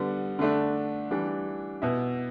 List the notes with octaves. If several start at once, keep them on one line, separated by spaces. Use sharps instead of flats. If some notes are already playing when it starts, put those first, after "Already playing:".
Already playing: D3 G3 B3
D3 A3 D4
E3 G3 D4
B2 B3 E4